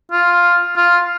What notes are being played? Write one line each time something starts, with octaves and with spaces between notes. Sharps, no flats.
F4
F4